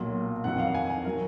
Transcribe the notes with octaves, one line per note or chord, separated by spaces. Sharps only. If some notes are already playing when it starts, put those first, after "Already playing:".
Already playing: B1 A#2 F#3
F2 D#3 F#3 F#5
F5
G#5
G#5
D#3 F#3 A#4